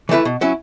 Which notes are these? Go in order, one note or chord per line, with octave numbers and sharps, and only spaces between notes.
E3 A3 E4 B4
B2
F#3 C#4 E4